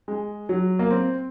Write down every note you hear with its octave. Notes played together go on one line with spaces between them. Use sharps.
G#3
F#3
A#3
C4